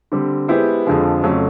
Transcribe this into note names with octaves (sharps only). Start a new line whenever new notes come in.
D3 G3 C4
G#3 B3 E4 G4 C5
F2 D3 F3 G#3
F2 C#3 F#3 A3 C4